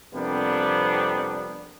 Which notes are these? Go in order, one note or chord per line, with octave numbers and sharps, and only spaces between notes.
F2 C3 G3 A#3 B3 D4